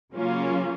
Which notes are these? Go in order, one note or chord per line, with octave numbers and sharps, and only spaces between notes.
C#3 F#3 A#3 C#4 F4